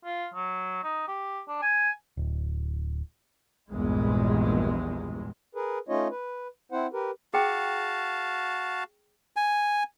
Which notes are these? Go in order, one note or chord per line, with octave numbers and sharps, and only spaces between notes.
F4
F#3
D#4
G4
D4
G#5
D1
A#1 E2 G2 A#2 G#3
G#4 A#4 B4
A3 C#4 D#4 F4 C#5 D#5
B4
C4 E4 C5 F#5
G4 A#4 B4
F#4 G#4 F5 G5 A5
G#5